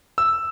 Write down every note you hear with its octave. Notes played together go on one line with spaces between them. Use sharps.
E6